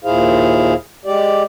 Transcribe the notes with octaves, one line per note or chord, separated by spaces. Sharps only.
D#2 A#2 E4 G#4 C5 F5
G#3 G4 D5